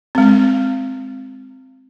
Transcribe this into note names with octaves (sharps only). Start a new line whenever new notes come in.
G#3 C4